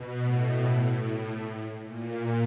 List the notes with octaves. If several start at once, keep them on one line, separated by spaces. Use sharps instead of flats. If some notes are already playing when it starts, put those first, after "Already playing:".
Already playing: B2
A2
A2
A#2